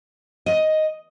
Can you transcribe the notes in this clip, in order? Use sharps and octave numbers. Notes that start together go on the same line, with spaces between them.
D#5